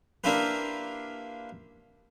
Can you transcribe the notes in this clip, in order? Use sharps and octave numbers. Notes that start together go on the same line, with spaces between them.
A#3 D4 E4 F4 G4 B4